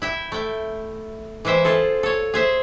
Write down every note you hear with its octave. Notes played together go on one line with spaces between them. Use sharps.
E4 E5 G5
A3 G5
E3 G#3 C5 E5 G5
F4 G#4 A4
A4 C#5
G#4 C5 E5